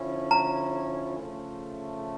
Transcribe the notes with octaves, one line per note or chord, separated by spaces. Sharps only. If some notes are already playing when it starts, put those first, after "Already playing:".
Already playing: D3 F3 C#4 E4
A#5
C#3 F3 A3